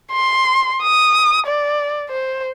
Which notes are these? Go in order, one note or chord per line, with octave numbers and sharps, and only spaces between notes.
C6
D#6
D5
C5